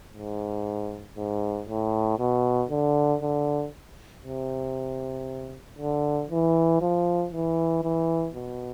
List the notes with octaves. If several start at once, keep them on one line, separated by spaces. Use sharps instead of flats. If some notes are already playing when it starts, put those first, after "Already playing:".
G#2
G#2
A2
B2
D3
D3
C3
D3
E3
F3
E3
E3
B2